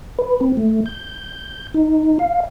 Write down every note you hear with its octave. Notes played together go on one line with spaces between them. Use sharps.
B4
C4
A3
G6
D#4
F5